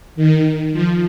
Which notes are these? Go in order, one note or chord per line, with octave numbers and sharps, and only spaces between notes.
D#3
F3